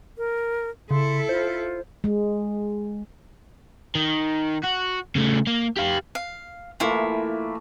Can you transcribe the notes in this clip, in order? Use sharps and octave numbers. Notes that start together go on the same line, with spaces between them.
A#4
C#3 E4 A4 C6
F4 C5
G#3
D#3
F#4
C#3 A3
A#3
G4 F5
F5
E3 A3 A#3 E4 F4